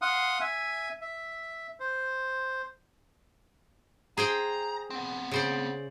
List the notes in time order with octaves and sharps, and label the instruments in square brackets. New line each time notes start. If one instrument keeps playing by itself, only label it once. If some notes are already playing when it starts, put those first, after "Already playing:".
[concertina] F5 F#5 C6 D#6
E5 G#5
E5
C5
[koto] G#4 C5 G5 [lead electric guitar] A#5
[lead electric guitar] B3 C4
[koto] C#3 C5 D5